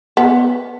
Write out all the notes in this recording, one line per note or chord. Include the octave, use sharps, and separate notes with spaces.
B3